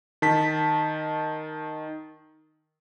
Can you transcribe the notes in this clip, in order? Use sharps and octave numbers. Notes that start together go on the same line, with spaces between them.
D#3 A5 B6